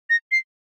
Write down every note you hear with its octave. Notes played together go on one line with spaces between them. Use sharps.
A#6
C7